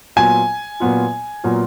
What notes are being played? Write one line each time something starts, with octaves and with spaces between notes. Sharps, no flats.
A#2 F#3 B3 F4 G#5
A#2 F#3 B3 F4
A#2 F#3 B3 F4